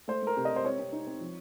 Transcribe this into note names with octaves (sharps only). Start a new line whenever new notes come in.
A3 C5
A3 A#4
C3
D#5
C3
C5
C4 C#5
C4
D#4
C4
F3